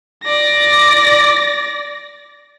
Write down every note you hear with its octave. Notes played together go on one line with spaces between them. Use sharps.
D5 A#6